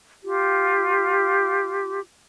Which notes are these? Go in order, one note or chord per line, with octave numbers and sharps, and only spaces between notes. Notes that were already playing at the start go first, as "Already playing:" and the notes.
F4 G4